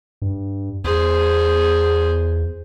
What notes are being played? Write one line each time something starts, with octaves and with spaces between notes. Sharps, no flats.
G2
E2 G#4 C5